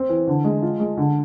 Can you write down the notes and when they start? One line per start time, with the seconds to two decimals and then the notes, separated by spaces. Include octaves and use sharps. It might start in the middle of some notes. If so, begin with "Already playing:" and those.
Already playing: C4
0.09 E3
0.27 D3
0.44 G#3
0.62 F4
0.80 G#3
0.97 D3